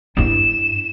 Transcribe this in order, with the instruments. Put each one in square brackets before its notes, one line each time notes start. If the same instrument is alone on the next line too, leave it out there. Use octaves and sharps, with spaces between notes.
[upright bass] G2 E4 [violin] E7